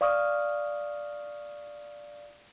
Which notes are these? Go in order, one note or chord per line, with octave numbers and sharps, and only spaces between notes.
D5 F5 C#6 D#6 F6